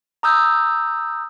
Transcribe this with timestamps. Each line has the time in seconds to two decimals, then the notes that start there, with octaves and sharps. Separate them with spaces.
0.23 A#5 D#6 E6 G6